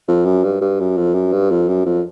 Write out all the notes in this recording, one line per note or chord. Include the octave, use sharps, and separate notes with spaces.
F2
F#2
G2
G2
F#2
F2
F#2
G2
F2
F#2
F2